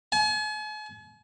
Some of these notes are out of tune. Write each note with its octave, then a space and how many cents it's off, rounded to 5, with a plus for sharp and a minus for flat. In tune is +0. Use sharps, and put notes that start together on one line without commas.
G#5 +45